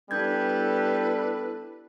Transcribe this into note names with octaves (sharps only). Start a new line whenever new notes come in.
G3 B3 D4 E4 A4 B4 G6 G#6